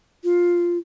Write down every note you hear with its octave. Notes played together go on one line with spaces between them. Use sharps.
F4